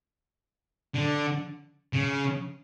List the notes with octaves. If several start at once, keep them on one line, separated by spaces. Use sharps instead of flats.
D3
C#3